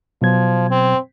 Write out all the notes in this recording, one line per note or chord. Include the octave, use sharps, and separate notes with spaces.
B2 F3 F#3 G#6
C4